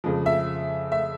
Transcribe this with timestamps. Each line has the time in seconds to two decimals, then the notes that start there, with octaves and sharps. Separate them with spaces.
0.04 F2 C#3 F3 G#3
0.26 E5
0.92 E5